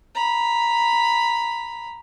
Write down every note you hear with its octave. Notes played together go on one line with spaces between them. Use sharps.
A#5 B5